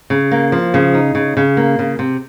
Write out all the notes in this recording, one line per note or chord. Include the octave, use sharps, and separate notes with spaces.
C#3
A#3
F3
C#3
D#4
C#3
C#3
A#3
C#3
C3